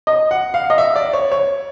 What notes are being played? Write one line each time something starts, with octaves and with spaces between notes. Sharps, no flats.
D#5
F#5
F5
D#5
E5
D5
C#5
C#5